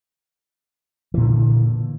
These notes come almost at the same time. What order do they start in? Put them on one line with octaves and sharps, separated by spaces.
E3 A#2 D3